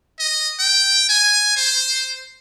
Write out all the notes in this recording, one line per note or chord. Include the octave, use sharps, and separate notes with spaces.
D#5
G5
G#5
C5